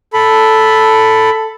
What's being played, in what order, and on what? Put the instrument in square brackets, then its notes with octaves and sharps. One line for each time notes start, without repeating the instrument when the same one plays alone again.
[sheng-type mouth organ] A4 B5